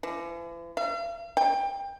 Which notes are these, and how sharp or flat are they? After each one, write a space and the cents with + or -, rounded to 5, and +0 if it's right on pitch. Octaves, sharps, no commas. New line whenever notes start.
E3 +45
F5 -45
G5 +20